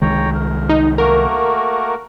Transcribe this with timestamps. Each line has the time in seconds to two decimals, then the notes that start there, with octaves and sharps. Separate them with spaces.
0.02 C2 D#3 G#3 C#5 G5 A#5
0.34 A#4
0.69 D#4
0.98 A3 A#3 F#4 A#4